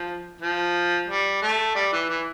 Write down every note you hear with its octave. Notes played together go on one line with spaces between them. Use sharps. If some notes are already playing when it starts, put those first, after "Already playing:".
Already playing: F3
F3
G3
A3
G3
E3
E3